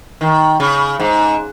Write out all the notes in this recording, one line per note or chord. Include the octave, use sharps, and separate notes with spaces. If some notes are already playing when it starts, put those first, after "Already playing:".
D#3
C#3
G#2